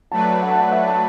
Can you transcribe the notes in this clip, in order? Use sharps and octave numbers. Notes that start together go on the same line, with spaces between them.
F#3 A3 D4 B4 A5
F#5
A5
F#5
E5
A5